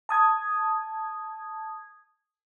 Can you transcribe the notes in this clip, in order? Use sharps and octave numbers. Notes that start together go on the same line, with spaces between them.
A5 D#6 G#6